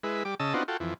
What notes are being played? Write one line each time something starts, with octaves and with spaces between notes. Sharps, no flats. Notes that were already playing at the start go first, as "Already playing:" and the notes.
G#3 E4 B4
G3 D6
C#3 D#5 A5 E6
B3 C4 D4 D#4 F4 F#4
F4 F#4 A4 G5
F2 E3